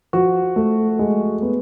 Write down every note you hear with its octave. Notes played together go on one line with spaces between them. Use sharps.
F3 F#4
A3
G#3
B3